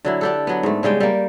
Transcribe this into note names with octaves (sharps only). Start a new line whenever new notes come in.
D3 F#3 E4
D4 G4 A4
F#3 B3
G#2 A3
C#3 G3 G#3 G5
G3 A#3